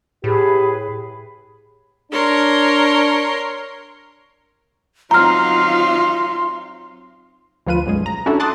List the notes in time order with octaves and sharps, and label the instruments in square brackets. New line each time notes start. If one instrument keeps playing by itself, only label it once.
[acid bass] A2 [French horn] G4 [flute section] G#4 B4
[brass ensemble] D4 [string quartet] A#4 C#5 C6
[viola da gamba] F#3 C4 D#4 [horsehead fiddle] F4 F5 [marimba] A#5 F6 [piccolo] C6
[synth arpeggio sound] D2 F3 F4 B4 D#7
B1 F#2 G#3
A#5
C#4 D4 E4 F#4 A4
A5 C6 D6 D#6 F#6 A6